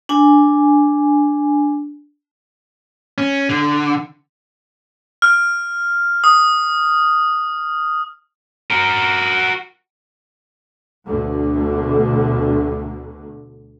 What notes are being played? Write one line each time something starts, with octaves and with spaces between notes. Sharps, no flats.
D4 G#5
C#4
D3
F6
D#6
F#4 A#4
D2 B2 D3